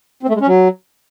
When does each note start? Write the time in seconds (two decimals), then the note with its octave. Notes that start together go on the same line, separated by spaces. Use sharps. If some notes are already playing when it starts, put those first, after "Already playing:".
0.23 C4
0.29 A3
0.35 G#3
0.41 C#4
0.47 F#3